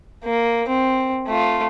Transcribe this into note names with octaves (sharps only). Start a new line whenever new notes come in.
A#3
C4
A3 F4